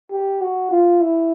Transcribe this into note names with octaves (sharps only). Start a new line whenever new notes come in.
G4
F#4
F4
E4